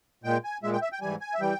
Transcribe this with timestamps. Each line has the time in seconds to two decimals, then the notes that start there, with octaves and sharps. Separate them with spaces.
0.24 A#2 G#3 G5
0.44 G#5
0.63 A#2 G#3 E5
0.73 G5
0.82 E5
0.92 G5
1.01 G#2 E3 G3 G#5
1.21 G#5
1.34 E5
1.40 E3 G3 G5